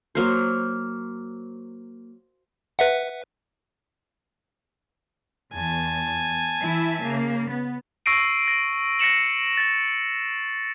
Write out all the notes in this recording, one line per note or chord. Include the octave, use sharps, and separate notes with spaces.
F#3 A#3 C5
B4 E5 F#5
E2 G#5 A5
E3 E4 E5
C#3 A#3
B3
C#6 E6 A#6 C7 D7 D#7
A#6
A#6 C7 C#7 E7 F#7
A6 A#6